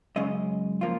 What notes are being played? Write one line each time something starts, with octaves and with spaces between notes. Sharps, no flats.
F#2 C#3 G#3 C#4 D#5
F3 A#3 F4